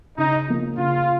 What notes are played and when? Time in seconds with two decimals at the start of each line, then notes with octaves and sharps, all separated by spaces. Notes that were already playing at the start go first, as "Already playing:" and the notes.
0.18 C#3 D#4
0.48 F3 A#3
0.77 C#3 F4